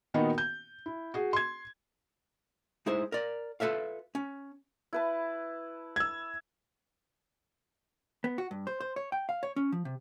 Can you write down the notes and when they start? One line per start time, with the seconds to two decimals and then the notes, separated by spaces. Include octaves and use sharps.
0.14 A#2 D#3 B3 D#4 F#4
0.38 G6
0.86 E4
1.14 F#4 G#4
1.33 C6 G#6
2.86 G#3 D#4 E4 G#4 C5
3.12 A#4 D5
3.60 F4 A4 B4 E5 F5
4.15 C#4
4.93 E4 B4 A5
5.96 E6 G#6
8.24 B3
8.38 F#4
8.51 G2
8.67 C5
8.80 C5
8.96 C#5
9.12 G5
9.29 F5
9.43 C#5
9.56 C#4
9.72 F3
9.85 C3